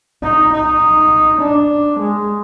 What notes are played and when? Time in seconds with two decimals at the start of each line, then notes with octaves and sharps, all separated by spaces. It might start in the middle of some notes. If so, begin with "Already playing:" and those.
0.23 D#4
0.53 D#4
1.41 D4
2.00 G#3